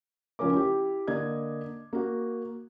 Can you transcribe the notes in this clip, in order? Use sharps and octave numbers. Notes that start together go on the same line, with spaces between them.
C#2 F3 C#4 A#4 D6
E4 G4
D3 A#3 D#5 G#6
A#3 F#4